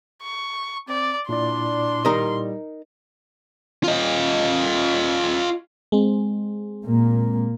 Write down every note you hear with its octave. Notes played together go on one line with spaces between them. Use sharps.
C#6
C4 D5
A#2 D4 E4 D5 C6
G3 D#4 A#4 D#5
F4 D#5
G#3 C4
A#2 A#3